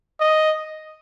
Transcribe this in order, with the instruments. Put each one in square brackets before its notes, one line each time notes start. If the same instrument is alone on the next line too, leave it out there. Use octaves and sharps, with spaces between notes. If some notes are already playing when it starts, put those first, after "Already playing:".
[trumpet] D#5